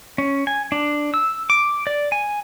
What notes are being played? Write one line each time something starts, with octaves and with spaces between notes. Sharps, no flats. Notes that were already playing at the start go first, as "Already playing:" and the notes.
C#4
G#5
D4
E6
D6
D5
G#5